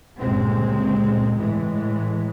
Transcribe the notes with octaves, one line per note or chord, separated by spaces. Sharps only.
G1 C#2 A#2 G#3 C4
A2 E3 G#3